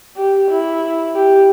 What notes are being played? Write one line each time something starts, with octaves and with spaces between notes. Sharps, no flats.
G4
E4
G4